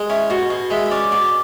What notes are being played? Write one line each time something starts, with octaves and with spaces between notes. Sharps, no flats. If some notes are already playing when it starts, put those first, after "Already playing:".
Already playing: G#3
C#4 E4
B2 F#4
B2 G#4
G#3 E5
E5
C#4 D5
B2 D5